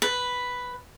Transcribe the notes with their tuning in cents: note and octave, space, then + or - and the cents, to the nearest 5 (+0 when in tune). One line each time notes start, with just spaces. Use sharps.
B4 +0